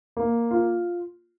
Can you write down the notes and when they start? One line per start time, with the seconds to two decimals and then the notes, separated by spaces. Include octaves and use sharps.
0.17 A#3
0.51 F4